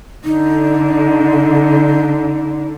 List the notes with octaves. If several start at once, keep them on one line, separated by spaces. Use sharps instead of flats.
D3 D#4